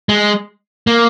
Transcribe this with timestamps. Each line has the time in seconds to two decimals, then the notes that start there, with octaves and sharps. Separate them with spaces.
0.09 G#3
0.87 A#3